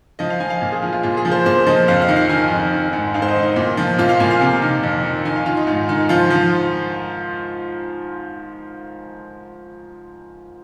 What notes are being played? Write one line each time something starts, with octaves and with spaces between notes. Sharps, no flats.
F3 D#5
F5
F3 G#5
F5
A#2
G#4
F3 F4
F4
A#2 F4
G#4
F3
C5
A#2 C5
F3 D#5
F2 F5
F5
D#3
F5
D#3 G#5
F2
D#3
G#2
G#2 F5
C5
D#5
D#3
D#4
A#2
F3
A#2 F4
F5
A#2 G#5
F5
C3
D#3
F2
D#3
D#3 G#5
F5
D#3 F4
D#4
G#2
D#3
F3 F4
F3